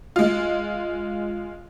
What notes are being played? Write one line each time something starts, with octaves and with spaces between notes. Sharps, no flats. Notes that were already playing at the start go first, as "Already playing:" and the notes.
G#3 F4